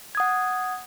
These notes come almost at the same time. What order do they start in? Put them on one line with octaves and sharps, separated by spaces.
G#6 D#6 F#5